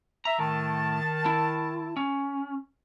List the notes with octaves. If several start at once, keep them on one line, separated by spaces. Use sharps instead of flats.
E5 A#5
A2 D#3 A5
E4
C#4